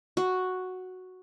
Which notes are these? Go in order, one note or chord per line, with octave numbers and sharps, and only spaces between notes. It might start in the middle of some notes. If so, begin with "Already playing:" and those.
F#4